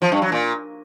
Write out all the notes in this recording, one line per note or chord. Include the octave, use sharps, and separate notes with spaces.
F3
G2
F#3
A#2